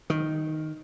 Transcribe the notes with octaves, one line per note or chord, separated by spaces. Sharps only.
D#3